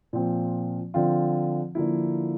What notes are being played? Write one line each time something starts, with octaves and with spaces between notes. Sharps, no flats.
A#2 F3 C4
D3 F3 C4 F4
D3 F3 A#3 E4